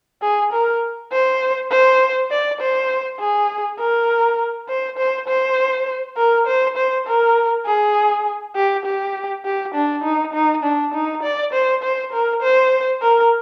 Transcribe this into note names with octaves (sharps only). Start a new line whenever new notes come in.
G#4
A#4
C5
C5
D5
C5
G#4
A#4
C5
C5
C5
A#4
C5
C5
A#4
G#4
G4
G4
G4
D4
D#4
D#4
D4
D#4
D5
C5
C5
A#4
C5
A#4